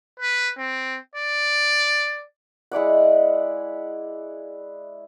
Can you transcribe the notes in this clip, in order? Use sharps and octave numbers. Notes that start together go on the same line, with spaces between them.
B4
C4
D5
G#3 E4 D5 F#5